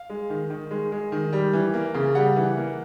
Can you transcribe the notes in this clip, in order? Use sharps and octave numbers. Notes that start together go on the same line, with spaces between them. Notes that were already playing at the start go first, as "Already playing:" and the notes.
Already playing: F5
G#3
D#3
D#3
G#3
G#3
D#3
G3
E3
A#3
C#3
G3 F#5
E3
A#3